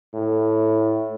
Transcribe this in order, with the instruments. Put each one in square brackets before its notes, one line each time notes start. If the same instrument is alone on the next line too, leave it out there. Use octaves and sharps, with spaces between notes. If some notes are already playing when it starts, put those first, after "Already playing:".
[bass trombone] A2